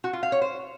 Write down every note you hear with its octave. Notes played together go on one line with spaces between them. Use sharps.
F#4
F4
F5
C#5
C5